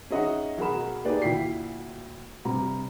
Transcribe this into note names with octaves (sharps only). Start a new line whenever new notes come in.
C#4 D#4 G#4 D#5 E5 F#5
B1 F#4 G#4 A#4 B5 E7
A#3 D#4 G4 G#4 B4 D5
D2 A#2 E4 G5 B6 C7
G2 C3 A#5